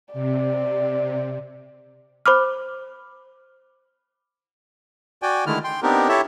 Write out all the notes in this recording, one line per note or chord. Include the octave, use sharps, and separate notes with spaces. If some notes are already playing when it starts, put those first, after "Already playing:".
C3 D5
C5 B5 D6 F6
F#4 D5 G5 G#5
D3 D#3 G#3 A3 E4 F6
G5 C6
B3 C4 D4 D#4 G4 A#4
E4 G4 A4 C#5 E5